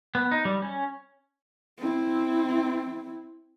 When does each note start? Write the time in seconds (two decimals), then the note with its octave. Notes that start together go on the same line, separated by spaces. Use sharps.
0.15 B3
0.31 D#4
0.45 G3
0.62 C#4
1.78 C4 E4